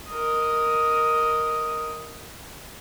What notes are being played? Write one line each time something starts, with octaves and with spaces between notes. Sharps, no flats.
A#4 D#5